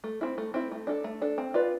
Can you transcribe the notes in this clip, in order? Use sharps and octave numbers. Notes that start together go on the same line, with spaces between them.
A3
C4 E4
A3
C4 E4
A3
D4 A4
A3
D4 A4
C4
F4 B4 D5